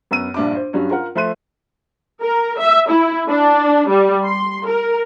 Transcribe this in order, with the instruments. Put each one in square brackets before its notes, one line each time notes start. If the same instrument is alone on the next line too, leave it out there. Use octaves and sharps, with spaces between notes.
[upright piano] F#2 B3 E6 D#7
A#1 G2 D4 E5 D6
C5
G2 F#3 G3 C#4
F4 A#4 F#5
F3 A3 E5 C6 F#6 D#7
[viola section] A#4
E5
E4
D4
G3
C6
A#4